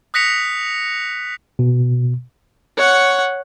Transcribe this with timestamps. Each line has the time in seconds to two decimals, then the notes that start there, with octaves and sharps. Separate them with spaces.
0.14 D#6 F#6 A#6 B6 C#7 F7
1.59 B2
2.78 C#5 F#5